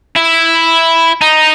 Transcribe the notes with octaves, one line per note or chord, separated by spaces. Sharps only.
E4
D#4